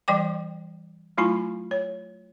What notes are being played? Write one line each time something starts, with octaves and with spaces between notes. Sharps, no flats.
E3 G3 D5 G5 D6
F#3 A3 E4 F4 G#5 B5
C#5